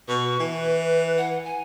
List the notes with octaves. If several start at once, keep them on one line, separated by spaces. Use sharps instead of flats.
B2 C#6
E3
B4
F#5
G#5